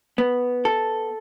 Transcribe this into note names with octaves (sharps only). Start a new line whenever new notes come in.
B3
A4